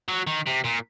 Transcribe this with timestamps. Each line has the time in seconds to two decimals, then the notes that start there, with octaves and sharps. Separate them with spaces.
0.08 F#3
0.27 D#3
0.47 C3
0.65 A#2